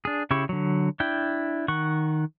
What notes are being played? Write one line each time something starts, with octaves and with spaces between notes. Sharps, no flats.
D4 G#4
C#3 E4 G4 C#6
D3 F#3
D4 E4 G5
D#3 F#5 C#6